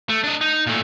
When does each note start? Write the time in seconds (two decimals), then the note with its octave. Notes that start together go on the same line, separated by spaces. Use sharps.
0.09 A3
0.24 D4 D#5
0.41 D#4
0.67 A#2 A3